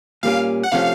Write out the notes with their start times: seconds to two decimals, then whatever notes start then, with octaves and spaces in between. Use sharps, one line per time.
0.23 A#2 G3 A#3 C#4 F5
0.63 F#5
0.72 C3 F3 A3 C#4 F5